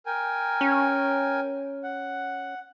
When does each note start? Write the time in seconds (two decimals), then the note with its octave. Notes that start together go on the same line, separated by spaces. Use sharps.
0.06 A#4 G5 G#5
0.61 C#4
1.83 F#5